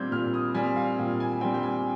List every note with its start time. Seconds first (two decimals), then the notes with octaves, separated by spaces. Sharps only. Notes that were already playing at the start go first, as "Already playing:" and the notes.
Already playing: A#2 G3 C4 G6 G#6
0.12 A#2 F6
0.34 D#6
0.54 G3 C4 G#5
0.76 F5
0.99 A#2 G5
1.20 G#5
1.41 G3 C4 G5
1.54 G5
1.63 G#5